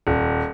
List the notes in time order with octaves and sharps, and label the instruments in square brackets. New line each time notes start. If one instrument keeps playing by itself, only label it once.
[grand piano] D#1